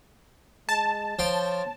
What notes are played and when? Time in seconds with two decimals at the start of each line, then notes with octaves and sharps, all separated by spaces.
0.69 G#3 A5
1.19 F3 C#5 G5 C6